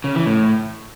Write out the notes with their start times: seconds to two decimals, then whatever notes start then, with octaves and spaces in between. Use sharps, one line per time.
0.04 C#3
0.15 E3
0.26 A2